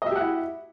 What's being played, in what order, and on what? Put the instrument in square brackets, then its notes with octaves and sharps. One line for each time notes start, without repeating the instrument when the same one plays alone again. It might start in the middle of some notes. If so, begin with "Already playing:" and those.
[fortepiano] D#5
E5
G4
F#5
E4